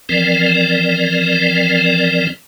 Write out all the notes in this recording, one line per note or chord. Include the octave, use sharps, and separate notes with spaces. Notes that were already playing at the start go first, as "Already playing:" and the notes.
E3 F3 C4 A#4 D5